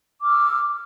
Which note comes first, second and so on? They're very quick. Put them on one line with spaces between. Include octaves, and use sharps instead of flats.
D6 F6 E6